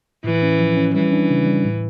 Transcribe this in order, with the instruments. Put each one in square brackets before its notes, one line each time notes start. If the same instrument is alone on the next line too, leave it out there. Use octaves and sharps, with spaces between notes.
[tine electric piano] A2 [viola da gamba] E3
[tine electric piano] C#4
F3
C#4
[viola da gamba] E3 [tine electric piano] G3
[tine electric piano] D4
C#3
G3
A2